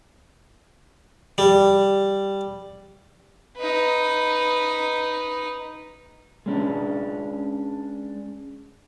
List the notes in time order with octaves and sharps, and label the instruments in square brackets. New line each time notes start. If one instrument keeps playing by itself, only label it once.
[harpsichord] G3
[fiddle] D#4 B4
[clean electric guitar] G#3 C#4 D4